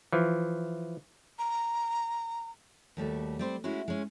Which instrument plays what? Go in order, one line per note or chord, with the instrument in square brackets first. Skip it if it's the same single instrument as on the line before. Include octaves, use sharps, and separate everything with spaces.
[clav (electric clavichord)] E3 F3
[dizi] A#5
[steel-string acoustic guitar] D#2 G3 A3 F#4
G3 C4 C5
G#3 C#4 E4 F#4
G#3 C#4